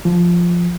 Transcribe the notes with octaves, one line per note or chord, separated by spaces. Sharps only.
F3